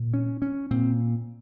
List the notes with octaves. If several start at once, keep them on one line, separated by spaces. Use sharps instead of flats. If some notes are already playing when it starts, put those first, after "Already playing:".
Already playing: A#2
C#4
C#4
A#2 C4